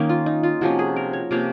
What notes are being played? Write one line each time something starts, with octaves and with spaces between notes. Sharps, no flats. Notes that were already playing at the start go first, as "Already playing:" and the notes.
Already playing: D#3 A#3 C#4 D#4
F4
D#4
F4
C3 F3 A#3 C#4 F#4
G#4
A#4
C#5
C3 F3 A#3 C#4 F5